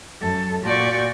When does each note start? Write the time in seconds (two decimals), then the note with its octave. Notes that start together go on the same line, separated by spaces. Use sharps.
0.21 F#2 A4
0.63 A#2 F4 F#4 D5 C#6 G6